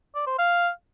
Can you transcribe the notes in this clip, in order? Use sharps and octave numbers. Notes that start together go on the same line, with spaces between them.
D5
C5
F5